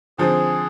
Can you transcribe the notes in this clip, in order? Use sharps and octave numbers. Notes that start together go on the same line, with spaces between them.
D3 F3 G#3 C4 G#4